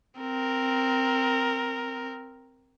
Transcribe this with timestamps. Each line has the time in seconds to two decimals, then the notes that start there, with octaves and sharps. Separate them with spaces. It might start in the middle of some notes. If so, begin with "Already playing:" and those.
0.20 C4 A#4